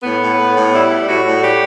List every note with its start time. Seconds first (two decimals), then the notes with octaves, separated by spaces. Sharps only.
0.02 A2 B3
0.20 A2
0.37 A2
0.55 A2
0.72 G3 E4
0.90 G3
1.07 A2 F#4
1.25 A2
1.42 G3 G4